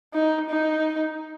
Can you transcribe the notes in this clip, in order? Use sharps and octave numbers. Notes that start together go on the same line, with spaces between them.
D#4
D#4